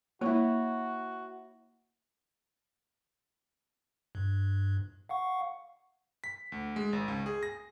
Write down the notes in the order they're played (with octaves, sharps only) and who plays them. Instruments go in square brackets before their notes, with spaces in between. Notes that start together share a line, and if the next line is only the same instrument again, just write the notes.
[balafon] A#3 [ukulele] E4 C#5 [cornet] F#4
[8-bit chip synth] G2
F5 F#5 C#6
[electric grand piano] B6
D2
G#3
G#1
C#2
G#4
A#6